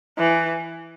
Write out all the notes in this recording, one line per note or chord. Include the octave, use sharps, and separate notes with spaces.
E3